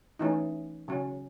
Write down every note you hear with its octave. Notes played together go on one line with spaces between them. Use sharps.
E3 A3 C#4 D#4
C#3 F#3 C#4